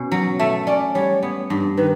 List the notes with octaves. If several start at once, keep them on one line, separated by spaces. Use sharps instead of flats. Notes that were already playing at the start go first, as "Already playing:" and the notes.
Already playing: B2 C#4
F#3
A3 E5
C#4 D5
G3 C#5
B3
G2
D#3 B4